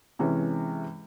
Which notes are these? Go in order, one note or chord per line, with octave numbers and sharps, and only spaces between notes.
C3 E3 G#3 C#4